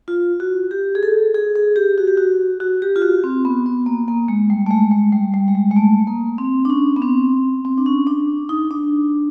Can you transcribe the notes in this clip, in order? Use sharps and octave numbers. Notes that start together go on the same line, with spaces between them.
F4
F#4
G4
G#4
A4
G#4
G#4
G4
F#4
G4
F#4
F#4
G4
F4
F#4
C4
B3
B3
A#3
A#3
G#3
G3
A3
G#3
G#3
G3
G3
G#3
G3
G#3
A3
A#3
C4
D4
C#4
B3
C4
C4
D4
C#4
D4
D#4
D4